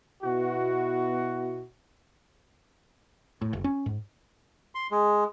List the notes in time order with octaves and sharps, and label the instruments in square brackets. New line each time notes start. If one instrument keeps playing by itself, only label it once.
[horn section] B2 B3 E4 F#4
[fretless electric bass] A2
F#1
C#4
G#2
[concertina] C6
G#3